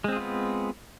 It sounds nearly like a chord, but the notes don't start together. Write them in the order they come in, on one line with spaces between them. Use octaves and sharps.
G#3 C4 G#4 F4 B3